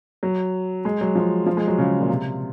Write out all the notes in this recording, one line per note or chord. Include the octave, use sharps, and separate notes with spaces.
F#3
G#3
F#3
F3
F3
G#3
F#3
C#3
A#2
C3